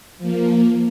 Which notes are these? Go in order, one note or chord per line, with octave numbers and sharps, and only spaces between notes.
F3 A#3